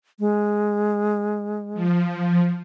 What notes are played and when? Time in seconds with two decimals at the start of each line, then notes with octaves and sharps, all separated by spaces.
0.20 G#3
1.74 F3